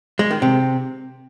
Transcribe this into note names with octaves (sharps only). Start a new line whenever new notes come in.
G#3
D#3
C3